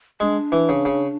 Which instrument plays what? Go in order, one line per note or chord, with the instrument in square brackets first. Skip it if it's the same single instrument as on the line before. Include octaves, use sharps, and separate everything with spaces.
[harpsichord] G#3 [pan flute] D4
[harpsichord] E3
C#3
C#3